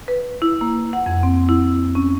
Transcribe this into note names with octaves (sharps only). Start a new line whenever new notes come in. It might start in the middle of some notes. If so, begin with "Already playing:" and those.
B4
E4
A#3
F#5
F2
C4
E4
C#4